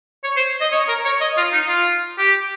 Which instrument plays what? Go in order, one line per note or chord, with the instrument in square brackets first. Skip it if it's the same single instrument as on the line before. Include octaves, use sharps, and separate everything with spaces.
[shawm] C#5
C5
D#5
C#5
A#4
C#5
D#5
F4
D#4
F4
G4